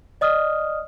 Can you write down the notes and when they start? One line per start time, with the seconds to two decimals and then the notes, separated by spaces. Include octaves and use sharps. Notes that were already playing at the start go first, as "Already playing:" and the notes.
0.21 D5 D#5 D#6 F6